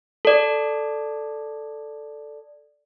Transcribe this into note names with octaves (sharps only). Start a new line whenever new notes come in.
A4 D5